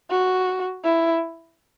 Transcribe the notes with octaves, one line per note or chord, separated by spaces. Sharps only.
F#4
E4